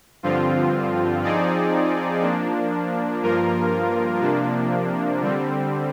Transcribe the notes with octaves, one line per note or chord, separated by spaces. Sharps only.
G2 D3 F3 C4 F4
F3 C4 D#4 G#4 D5
F3 A#3 D4
G2 F3 A#3 F4 A#4
C3 F3 A#3 D4
D3 G3 C4